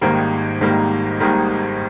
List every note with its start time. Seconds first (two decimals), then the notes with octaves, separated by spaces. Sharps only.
0.01 G#1 G#2 D#3 G3 A#3
0.61 G#1 G#2 D#3 G3 A#3
1.20 G#1 G#2 D#3 G3 A#3